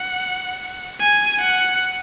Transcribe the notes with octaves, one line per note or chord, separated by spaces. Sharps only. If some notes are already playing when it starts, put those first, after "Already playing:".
Already playing: F#5
G#5
F#5